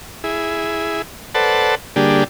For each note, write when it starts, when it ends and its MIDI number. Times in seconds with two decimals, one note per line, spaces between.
0.24 1.02 64
0.24 1.02 68
1.35 1.75 69
1.35 1.75 71
1.35 1.75 72
1.35 1.75 74
1.35 1.75 78
1.35 1.75 81
1.96 2.24 50
1.96 2.24 55
1.96 2.24 58
1.96 2.24 62
1.96 2.24 67
1.96 2.24 68